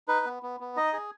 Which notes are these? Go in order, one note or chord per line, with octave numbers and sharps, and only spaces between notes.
D#4 B4
B3
B3
B3
D#4 D#5
G#4